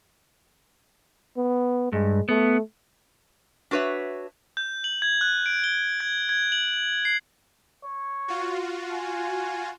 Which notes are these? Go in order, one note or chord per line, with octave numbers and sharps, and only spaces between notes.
B3
G2 G#3
A3 B3
D4 F#4 B4 C#5 E5
G6
F#7
G#6
F#6
D7
G7
G#6
G#6
F#7
C7
C#5
F4 F#4
G#5